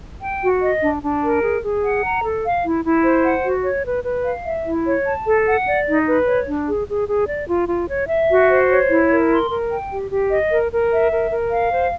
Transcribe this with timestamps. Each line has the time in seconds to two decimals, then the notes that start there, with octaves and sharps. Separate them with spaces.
0.21 G5
0.43 F#4
0.62 D#5
0.82 D4
1.03 D4
1.23 A#4
1.42 G#4
1.63 G#4
1.83 F#5
2.04 A#5
2.24 A4
2.44 F5
2.64 E4
2.84 E4
3.04 C5
3.25 F#5
3.45 F#4
3.65 C#5
3.85 B4
4.05 B4
4.26 F5
4.45 E5
4.66 E4
4.86 C#5
5.07 A5
5.26 A4
5.47 F#5
5.67 D5
5.86 D#4
6.07 B4
6.27 C#5
6.48 D4
6.67 G#4
6.88 G#4
7.08 G#4
7.28 D5
7.48 F4
7.69 F4
7.89 C#5
8.08 E5
8.29 F#4
8.49 C5
8.70 C#5
8.90 E4
9.10 A#4
9.30 C6
9.50 A#4
9.71 G5
9.91 G4
10.11 G4
10.31 D#5
10.51 A#4
10.72 A#4
10.92 E5
11.11 A#4
11.31 A#4
11.51 F5
11.72 C5